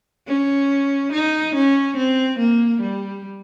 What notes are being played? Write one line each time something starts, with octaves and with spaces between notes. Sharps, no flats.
C#4
D#4
C#4
C4
A#3
G3